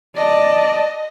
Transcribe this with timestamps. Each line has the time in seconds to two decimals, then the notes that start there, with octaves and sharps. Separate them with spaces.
0.17 D5 D#5 A5